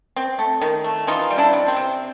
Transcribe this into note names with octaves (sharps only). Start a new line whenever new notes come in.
C4
A3
D#3
A3
E3 D#4 F4
G3
D4 E4
C3
C4
C3